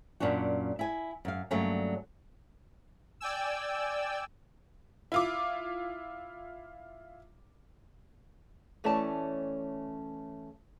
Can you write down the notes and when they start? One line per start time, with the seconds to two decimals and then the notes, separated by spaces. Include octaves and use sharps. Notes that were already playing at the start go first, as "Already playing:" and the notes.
0.20 F#2 A#2 C#4 D4 F#4
0.79 E4 G#5
1.25 F#2 F5
1.51 G2 D3 F#3 A3 A#3 C#4
3.20 D5 G5 G#5 E6
5.12 E4 F4 D6
8.84 E3 A3 C#4 C#5 D5 A5